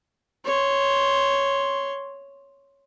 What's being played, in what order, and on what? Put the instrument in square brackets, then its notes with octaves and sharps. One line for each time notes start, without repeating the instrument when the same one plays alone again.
[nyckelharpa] C#5 C6